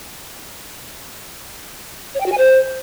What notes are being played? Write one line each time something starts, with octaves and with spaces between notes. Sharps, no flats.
C#5
G5
F#4
G#5
C5